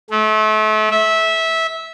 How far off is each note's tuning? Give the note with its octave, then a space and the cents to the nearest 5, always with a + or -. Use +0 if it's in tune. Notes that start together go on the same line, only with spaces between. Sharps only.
A3 -35
E5 -15